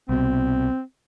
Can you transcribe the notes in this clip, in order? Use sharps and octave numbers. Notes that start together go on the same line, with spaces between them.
C2 B2 C4